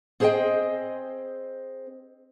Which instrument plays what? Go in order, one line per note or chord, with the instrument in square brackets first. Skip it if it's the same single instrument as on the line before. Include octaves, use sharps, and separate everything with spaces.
[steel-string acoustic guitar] C4 G#4 C5 C#5 D#5 G5